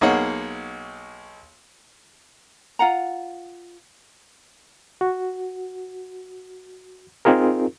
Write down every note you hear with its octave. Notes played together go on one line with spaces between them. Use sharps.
B1 A#3 D#4 G#4 C#5 F#5
F4 F5 F#5 A#5
F#4
C4 D#4 F4 G#4 A#4